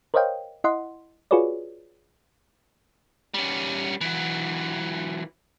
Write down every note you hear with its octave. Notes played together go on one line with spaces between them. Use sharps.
A#4 C5 C#5 D#5 F5 G5
E4 D#5 F#5 C6
F4 F#4 G#4 B4 C#5 D5
G3 C#4
E3 F#3